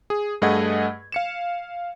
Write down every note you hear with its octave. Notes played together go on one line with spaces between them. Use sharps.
G#4
G2 A3 G#4 D#5 F#5 G#6
F5 C#7 E7